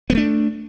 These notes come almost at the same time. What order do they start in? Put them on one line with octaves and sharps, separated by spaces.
B3 G3 A3 D4